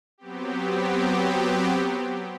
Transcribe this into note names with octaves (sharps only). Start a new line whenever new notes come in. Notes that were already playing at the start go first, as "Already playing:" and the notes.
F#3 B3 C4 G4